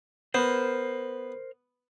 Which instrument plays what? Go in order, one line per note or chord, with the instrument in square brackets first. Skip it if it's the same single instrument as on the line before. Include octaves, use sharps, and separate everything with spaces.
[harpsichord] B3 [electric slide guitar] A#4 C5